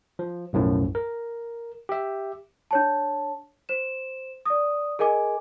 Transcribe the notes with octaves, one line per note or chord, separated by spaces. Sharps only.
F3
B1 F#2 A2 F3
A#4
G4 E5
D4 C#5 A5
C5 E7
D5 D#6
G#4 A#4 D#5 G#5 D6